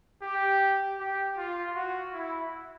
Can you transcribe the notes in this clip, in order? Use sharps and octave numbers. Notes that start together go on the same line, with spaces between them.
G4
G4
F4
F#4
E4